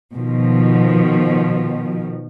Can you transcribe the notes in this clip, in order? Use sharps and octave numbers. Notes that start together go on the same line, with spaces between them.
B2 D#3 F3